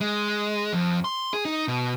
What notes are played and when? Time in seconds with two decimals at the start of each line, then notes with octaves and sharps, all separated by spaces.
0.01 G#3
0.73 F2
1.04 C6
1.33 G#4
1.45 D#4
1.68 B2